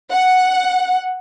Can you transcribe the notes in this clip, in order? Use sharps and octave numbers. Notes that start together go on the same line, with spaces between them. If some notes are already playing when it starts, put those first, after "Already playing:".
F#5